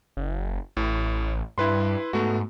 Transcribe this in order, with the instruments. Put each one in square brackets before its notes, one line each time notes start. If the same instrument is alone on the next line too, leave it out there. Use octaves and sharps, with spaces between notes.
[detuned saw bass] F#1
[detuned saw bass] A1 [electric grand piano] A2
[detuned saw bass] G2 [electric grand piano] E4 B4 C6
[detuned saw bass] G#2 [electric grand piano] A3 B3 F#4